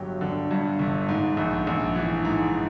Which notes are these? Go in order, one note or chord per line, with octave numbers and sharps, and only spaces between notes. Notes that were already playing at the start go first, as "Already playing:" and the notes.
Already playing: G1 G2 F#3 G4
D3
G2
G1
G#2
A#1
A#1
E3
G#2